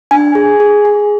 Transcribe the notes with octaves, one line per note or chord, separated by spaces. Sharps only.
D4 G#5
G#4
G#4
G#4